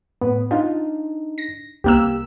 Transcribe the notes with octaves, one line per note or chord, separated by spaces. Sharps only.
A2 B3
D4 D#4 F4
A#6
C2 A#3 G4 E6